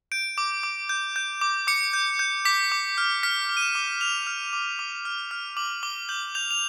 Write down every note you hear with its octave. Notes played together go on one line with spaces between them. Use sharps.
G6 D7
D6
D6
G6
G6
D6
D6 C#7
G6
G6
D6 B6
D6
F6
F6 B6
D6
D#7
E7
D6
F6 F7
F6
D6
D6
F6
F6
D6 F#7
D6 G7
G6 F#7
G6 F7
F7